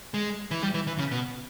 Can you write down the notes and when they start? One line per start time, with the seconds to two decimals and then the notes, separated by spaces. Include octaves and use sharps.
0.14 G#3
0.51 E3
0.62 G3
0.74 E3
0.87 E3
0.98 C#3
1.11 B2